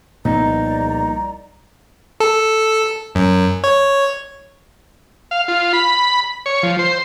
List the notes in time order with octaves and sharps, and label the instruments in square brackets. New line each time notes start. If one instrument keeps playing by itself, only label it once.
[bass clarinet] C2 [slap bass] A#2 F3 B3 [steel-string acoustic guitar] D#4 [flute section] D5 A#5
[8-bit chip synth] A4
F#2
C#5
[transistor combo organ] F5
F4
B5
C#5
F3
C5